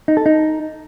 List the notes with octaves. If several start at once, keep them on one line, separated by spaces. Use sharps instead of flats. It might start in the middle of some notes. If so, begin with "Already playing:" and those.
D#4
A4
D#4